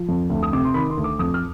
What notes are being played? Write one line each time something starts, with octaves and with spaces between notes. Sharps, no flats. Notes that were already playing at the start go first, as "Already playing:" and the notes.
Already playing: F3
F2
D2
D#6
C3 D6
C6
D#3 B5
C6
D2
D6
F2 D#6
F6